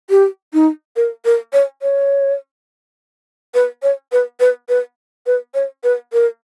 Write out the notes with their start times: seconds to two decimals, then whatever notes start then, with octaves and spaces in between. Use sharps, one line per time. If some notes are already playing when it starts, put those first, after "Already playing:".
0.10 G4
0.53 D#4
0.96 A#4
1.25 A#4
1.53 C#5
1.82 C#5
3.54 B4
3.83 C#5
4.12 B4
4.40 B4
4.69 B4
5.26 B4
5.54 C#5
5.84 B4
6.13 A#4